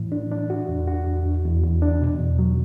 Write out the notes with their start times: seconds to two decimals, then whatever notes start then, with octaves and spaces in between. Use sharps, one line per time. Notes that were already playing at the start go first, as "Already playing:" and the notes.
Already playing: A2 E3
0.12 D4
0.31 D4
0.50 F#4
0.69 E2
0.87 F#4
1.07 E2
1.26 E2
1.44 E2
1.63 E2
1.82 D4
2.01 B2
2.19 E2
2.39 F#3